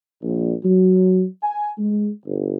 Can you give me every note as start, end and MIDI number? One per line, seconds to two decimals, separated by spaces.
0.22 0.53 34
0.64 1.25 54
1.43 1.68 80
1.78 2.10 56
2.25 2.57 31